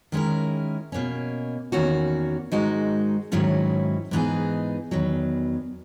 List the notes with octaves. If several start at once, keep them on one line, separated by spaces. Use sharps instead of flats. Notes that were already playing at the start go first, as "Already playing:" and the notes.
D#3 G#3 C#4 E4 A#4
B2 A#3 C#4
E2 D#3 A#3 C#4 F#4
G#2 D#3 G#3 D#4 F#4
G#2 D#3 F#3 C#4 E4
G#2 E3 B3 D#4 G#4
E2 D#3 F#3 B3